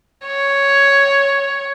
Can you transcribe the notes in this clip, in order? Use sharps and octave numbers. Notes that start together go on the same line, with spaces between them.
C#5